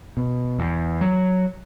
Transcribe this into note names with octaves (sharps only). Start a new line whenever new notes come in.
B2
E2
F#3